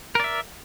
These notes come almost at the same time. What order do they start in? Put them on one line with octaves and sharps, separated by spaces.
A#4 D5 E5